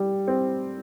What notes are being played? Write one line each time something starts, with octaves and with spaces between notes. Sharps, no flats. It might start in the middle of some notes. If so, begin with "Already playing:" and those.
Already playing: G3
C4